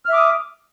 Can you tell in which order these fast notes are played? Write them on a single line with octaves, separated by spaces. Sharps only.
F6 E5 D6 D#6